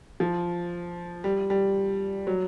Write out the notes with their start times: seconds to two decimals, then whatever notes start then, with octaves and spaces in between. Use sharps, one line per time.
0.20 F3
1.24 G3
1.50 G3
2.27 F#3